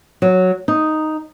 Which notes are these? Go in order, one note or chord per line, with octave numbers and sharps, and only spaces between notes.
F#3
D#4